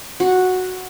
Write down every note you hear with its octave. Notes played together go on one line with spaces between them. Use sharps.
F#4